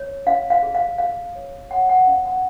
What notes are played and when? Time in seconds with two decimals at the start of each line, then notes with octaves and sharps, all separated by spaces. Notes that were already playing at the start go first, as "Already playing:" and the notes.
Already playing: C#5
0.27 C#4 F5
0.50 F5
0.63 G#4
0.75 F5
0.98 G#4 F5
1.35 C#5
1.71 C#5 F#5
1.89 F#5
2.07 C#4 F5
2.25 F#5